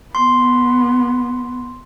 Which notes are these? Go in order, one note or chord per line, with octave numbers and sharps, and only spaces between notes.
B3 C6